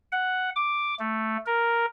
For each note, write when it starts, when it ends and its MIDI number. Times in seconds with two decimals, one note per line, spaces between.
0.12 0.50 78
0.56 0.94 86
0.99 1.37 57
1.46 1.86 70